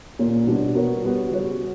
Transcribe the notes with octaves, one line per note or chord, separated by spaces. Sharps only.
A#2 A#3 C#4
B2 G3 B3 D4 F#4
B3 F#4 A#4 C#5
G3 B3 F#4
C#3 G3 C#4 F#4 C#5